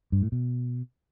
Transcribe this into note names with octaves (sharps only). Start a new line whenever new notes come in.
G2
A2
B2